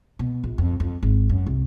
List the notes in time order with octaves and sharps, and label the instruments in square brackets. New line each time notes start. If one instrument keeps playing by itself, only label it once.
[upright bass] B2
A#1
F2
F2
G#1
F#2
C2